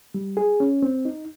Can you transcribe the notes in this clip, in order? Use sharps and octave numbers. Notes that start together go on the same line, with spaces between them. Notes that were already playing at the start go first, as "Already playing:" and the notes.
G3
G#4
C#4
C4
D#4